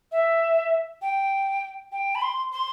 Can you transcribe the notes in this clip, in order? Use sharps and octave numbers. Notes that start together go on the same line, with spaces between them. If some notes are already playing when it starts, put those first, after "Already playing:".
E5
G5
G5
B5
C6
C6